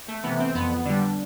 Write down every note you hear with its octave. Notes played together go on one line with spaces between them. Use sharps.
A3
C3 E3 B3
C4
F2 B3
D3 G3 D4